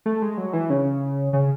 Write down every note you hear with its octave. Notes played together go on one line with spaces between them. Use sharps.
A3
G#3
F#3
E3
C#3
C#3